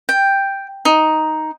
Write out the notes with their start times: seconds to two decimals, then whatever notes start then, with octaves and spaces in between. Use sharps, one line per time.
0.09 G5
0.85 D#4